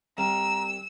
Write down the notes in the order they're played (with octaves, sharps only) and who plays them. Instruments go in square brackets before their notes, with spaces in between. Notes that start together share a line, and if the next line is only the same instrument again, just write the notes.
[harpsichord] C2 [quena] A#5 [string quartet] E6